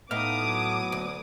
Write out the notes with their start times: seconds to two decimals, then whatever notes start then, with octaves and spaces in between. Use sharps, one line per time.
0.11 A2 B3 D#4 F5 D6 D#6
0.42 F#3
0.92 D2